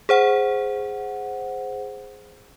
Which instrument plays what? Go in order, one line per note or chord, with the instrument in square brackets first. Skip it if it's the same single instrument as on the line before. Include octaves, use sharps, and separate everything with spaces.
[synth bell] G#4 C5 F#5